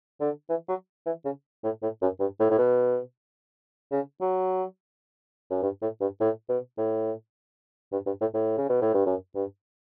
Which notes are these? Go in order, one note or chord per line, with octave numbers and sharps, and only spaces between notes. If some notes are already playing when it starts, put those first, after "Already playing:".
D3
E3
F#3
E3
C#3
A2
A2
F#2
G2
A2
A2
B2
C#3
F#3
F#2
G2
A2
G2
A2
B2
A2
G2
G2
A2
A2
C#3
B2
A2
G2
F#2
G2